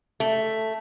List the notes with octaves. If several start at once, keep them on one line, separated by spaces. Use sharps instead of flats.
A3